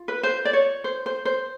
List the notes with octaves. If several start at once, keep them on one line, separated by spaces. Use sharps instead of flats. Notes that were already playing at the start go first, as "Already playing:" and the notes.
Already playing: F4
B4
C5
D5
C#5
C5
C5
C5